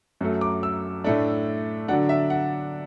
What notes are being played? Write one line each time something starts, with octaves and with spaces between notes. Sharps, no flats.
F#2 F#3 A3
D6
E6
A2 A3 D4
D3 F#3 D4 F#5
E5
F#5